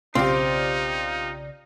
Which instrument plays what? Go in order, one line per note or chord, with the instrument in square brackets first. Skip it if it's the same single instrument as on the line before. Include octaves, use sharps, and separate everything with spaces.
[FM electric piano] B1 C#3 D5 [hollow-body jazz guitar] C4 [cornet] D#4 [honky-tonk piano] F4 G4